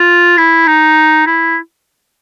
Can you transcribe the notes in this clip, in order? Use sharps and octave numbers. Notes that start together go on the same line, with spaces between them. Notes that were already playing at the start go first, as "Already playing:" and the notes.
Already playing: F4
E4
D#4
E4